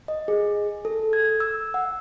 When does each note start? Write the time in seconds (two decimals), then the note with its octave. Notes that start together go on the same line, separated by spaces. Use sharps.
0.08 D#5
0.28 G#4
0.85 A4
1.13 G#6
1.40 E6
1.74 F#5